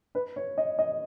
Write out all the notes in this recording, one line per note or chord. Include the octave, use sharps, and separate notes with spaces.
B4
C#5
D#5
D#5